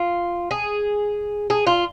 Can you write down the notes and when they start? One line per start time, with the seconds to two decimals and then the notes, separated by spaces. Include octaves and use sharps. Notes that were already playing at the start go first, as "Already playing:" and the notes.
Already playing: F4
0.51 G#4
1.50 G#4
1.66 F4